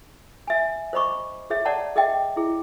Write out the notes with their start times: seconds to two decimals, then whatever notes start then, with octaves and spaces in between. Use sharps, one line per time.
0.47 E5 G#5
0.93 C5 D#5 B5 C#6 D6
1.50 G#4 C#5 E5
1.65 C#5 D5 F#5 A5 A#5
1.96 G#4 D#5 E5 G5
2.36 E4 G#4